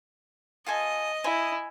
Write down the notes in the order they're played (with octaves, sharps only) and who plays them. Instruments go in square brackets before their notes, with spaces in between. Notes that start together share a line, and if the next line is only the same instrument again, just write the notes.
[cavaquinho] F4 A4 G#5 [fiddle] D#5 D#6
[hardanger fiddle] E4 [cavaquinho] G#5